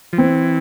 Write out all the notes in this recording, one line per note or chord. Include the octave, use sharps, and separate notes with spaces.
F3
E3 C4